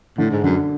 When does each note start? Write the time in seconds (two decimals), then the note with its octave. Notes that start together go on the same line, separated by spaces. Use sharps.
0.18 A2 D3
0.31 G#2
0.43 F#2 D3